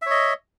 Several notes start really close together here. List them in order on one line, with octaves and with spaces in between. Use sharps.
E5 C#5 D#5